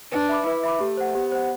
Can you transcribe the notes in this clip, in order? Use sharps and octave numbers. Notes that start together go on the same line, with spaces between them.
D4 B4
E5 B5 D6
E4 B4
E5 B5 D6
A3 G4
C5 F#5
B3 G4
C5 F#5